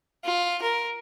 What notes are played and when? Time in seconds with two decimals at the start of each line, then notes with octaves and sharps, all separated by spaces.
0.25 F4
0.62 A#4